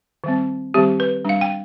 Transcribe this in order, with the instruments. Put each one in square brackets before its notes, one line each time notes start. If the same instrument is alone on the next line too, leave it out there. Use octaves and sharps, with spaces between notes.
[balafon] D#3 G3 C4
D#3 G3 C4 G4
B4
G3 D4 F5
G5